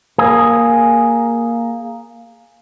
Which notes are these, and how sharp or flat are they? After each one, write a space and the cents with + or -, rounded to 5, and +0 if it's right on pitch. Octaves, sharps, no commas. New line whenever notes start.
A#3 +0 G#4 +0